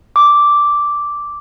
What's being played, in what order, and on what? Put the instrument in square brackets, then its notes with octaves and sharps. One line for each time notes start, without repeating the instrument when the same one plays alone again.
[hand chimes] D6